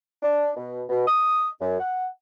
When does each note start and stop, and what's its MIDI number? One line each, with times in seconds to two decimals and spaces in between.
0.23 0.51 62
0.57 0.83 47
0.89 1.04 47
1.07 1.48 87
1.60 1.79 42
1.80 2.07 78